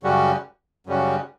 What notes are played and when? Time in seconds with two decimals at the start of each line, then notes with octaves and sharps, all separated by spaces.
0.03 F#2 C#3 G3 C#4 F#4
0.87 F#2 C#3 G3 C#4 F#4